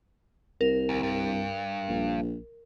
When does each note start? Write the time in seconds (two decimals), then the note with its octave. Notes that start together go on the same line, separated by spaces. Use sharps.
0.61 C2 A#4
0.89 D2
1.03 G2
1.88 A#1